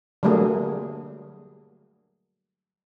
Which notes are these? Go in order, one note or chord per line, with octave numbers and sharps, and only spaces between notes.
D3 F#3 G3 A3 A#3 G#4